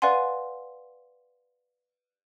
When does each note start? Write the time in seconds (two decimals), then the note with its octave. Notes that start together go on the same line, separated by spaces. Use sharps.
0.02 B4 D5 F5 F#5 G#5 C6